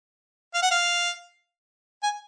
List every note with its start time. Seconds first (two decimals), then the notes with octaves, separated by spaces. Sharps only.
0.54 F5
0.63 F#5
0.71 F5
2.03 G#5